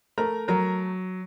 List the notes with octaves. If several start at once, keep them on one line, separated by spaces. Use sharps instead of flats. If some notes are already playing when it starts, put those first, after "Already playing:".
A3 A#4 A#5
F#3 A#4 A#5